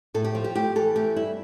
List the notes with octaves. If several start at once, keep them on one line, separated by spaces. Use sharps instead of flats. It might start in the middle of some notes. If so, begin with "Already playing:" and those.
A2 A4
G4
F3 F4
G4
A3 G4
E3 A4
A3 G4
G2 E4